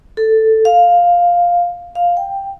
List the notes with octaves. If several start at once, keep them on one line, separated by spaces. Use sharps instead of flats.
A4
F5
F5
G5